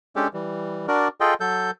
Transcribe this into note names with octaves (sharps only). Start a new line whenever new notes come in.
G#3 C#4 D4 G4 A4
E3 G3
D4 F#4 A#4 D5
F4 G#4 A4 D#5 G5
F#3 A4 G6